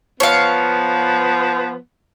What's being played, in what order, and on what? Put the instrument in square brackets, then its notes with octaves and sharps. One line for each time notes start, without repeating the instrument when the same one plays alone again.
[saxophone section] F3 B3 [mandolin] C#5 F5